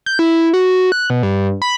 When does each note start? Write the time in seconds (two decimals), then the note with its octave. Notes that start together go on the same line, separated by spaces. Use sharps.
0.06 G6
0.19 E4
0.53 F#4
0.92 F#6
1.10 B2
1.23 G2
1.62 B5